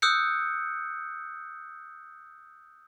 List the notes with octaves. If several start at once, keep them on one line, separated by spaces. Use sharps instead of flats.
D#6 E6 F#6 G6 C#7